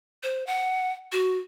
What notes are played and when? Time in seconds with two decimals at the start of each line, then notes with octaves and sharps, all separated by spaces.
0.23 C5
0.47 F#5
1.12 F#4